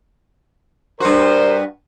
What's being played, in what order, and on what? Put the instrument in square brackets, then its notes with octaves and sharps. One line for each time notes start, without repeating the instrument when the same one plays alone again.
[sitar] G2 F#4 [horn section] A#4 C5